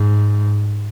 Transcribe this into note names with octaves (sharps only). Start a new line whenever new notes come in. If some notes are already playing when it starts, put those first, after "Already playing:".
Already playing: G#2